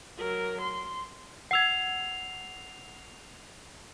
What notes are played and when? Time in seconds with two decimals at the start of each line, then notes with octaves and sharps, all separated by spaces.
0.18 F#3 A#4
0.62 C6
1.51 F#5 E6 G#6 C7 F7